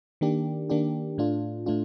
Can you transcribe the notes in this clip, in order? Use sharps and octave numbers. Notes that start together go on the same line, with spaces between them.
D#3 A#3 D4 G4
D#3 A#3 D4 G4
A2 A3 D4 F4
A2 A3 D4 F4